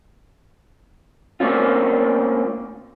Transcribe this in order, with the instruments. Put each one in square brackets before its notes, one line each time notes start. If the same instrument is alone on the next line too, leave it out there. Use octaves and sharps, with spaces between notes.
[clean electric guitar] A3 A#3 C4 C#4 F4